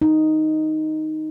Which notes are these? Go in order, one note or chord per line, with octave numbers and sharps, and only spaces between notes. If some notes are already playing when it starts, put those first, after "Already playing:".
D#4